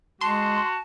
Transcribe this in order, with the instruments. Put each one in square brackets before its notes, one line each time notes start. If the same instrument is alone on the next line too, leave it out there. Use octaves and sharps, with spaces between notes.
[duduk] G#3 [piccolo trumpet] F#4 [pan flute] A5 [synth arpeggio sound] C6